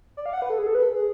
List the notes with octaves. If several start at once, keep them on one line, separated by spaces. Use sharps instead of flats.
D5
F5
F#5
B4
A4
G#4
A4
B4
A4
G#4